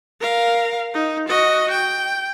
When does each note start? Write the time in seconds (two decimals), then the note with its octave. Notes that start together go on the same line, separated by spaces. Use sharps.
0.21 A#4 F5
0.94 D#4
1.28 F#4 D#5
1.71 G5